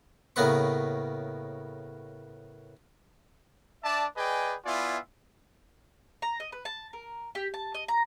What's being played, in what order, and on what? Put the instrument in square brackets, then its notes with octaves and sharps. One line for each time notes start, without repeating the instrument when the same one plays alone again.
[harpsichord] A2 C#3 A#3 B3 B4 C#6
[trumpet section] D4 D5 E5 A5
G#4 B4 D5 D#5 G5 G#5
B3 E4 F4 D5 E5 G#5
[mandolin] A#5
D#5
B4
A5
A#4
G4
A5
D#5
A#5